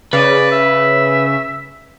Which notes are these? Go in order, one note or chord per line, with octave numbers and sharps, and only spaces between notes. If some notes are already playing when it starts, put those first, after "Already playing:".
C#3 B4 D5
E5